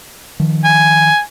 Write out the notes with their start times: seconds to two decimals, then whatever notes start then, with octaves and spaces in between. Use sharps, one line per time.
0.40 D#3 F3
0.64 G#5